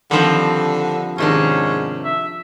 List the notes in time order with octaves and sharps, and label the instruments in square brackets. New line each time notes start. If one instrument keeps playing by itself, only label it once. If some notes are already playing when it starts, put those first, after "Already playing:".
[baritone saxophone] D3 [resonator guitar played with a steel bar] D#3 C4 [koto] F3 G3
[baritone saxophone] G#2 [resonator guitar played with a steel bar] C3 D#3 D4 [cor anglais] C#4
[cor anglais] E5